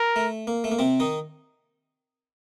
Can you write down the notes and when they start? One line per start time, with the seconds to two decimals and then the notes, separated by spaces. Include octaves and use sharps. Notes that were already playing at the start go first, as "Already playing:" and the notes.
Already playing: A#4
0.16 A3
0.47 A#3
0.64 A3
0.71 A#3
0.79 C3 C4
1.00 D#3 D#4